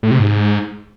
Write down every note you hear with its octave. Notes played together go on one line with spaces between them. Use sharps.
A2
C3
G#2